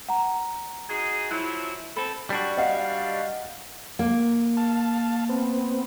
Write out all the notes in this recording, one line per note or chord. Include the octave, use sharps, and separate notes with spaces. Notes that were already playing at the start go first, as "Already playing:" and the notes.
F#5 A#5
D#4 F#4 G#4
F3 F#3 E4 F#6
C4 A4 B5
G3 D4 F#4
D#5 F5 F#5
A#3
F5 A5
B3 C4